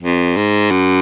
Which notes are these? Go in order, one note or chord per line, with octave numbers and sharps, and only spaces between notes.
F2
G#2
F#2